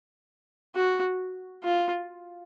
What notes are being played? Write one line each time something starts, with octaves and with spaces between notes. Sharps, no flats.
F#4
F4